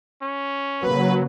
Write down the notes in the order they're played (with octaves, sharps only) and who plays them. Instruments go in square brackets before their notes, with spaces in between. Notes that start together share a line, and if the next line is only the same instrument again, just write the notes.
[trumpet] C#4
[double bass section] C#3 A#3 [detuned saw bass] F#3 [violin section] B4